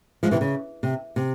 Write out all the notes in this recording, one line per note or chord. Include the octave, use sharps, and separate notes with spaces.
F3 G#3
C3 E3
C#3
C3
C3